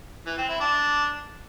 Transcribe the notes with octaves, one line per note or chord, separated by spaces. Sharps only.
E3
C4
E4
D4